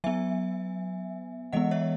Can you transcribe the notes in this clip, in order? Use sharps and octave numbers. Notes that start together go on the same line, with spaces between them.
F#3 B3 E5 G#5
E3 G#3 B3 D#5 F#5
C#5 E5